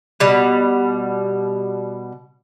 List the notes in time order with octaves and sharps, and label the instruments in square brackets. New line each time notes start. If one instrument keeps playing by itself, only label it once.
[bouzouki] B2 G3